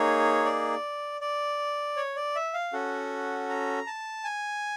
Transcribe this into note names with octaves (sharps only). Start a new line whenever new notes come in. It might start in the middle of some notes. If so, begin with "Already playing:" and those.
Already playing: A#3 D#4 G#4 C#5
D5
D5
C#5
D5
E5
F5
C#4 F#4 A4 F#5
A#5
A5
G#5